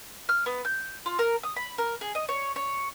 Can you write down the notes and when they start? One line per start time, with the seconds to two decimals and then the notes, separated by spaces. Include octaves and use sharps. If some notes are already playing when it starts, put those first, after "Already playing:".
0.29 F6
0.46 B3
0.65 G6
1.06 F4
1.19 A#4
1.43 D#6
1.56 B5
1.78 A#4
2.01 G#4
2.15 D#5
2.29 C#5
2.56 C#5